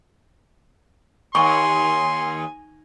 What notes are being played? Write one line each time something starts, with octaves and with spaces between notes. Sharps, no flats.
D#2 G#5 C6 C#6